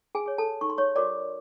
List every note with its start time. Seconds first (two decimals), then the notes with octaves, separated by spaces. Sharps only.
0.15 G#4 G#5
0.26 G#4 C#5
0.38 A4 A5
0.61 D#4 C#6
0.70 C6
0.78 C#5 C#6
0.96 F#4 A#4 C#5 D5 D6